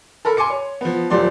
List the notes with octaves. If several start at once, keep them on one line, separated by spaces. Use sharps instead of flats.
A4 A#4 B5
G#5 C6 D6 C#7
C#5
F3 B3
D#1 F3 F#3 D5 C6